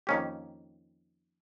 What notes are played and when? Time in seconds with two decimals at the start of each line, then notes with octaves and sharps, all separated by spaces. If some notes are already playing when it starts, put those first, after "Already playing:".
0.07 F2 D#3 A#3 C#4 G4